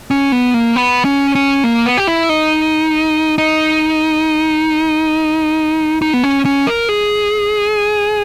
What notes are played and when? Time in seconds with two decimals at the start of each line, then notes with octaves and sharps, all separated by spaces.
0.11 C#4
0.32 B3
0.54 A#3
0.76 B3
1.05 C#4
1.35 C#4
1.64 A#3
1.86 B3
1.98 G4
2.07 E4
2.29 D#4
3.38 D#4
6.02 D#4
6.14 B3
6.24 C#4
6.45 C#4
6.67 A#4
6.89 G#4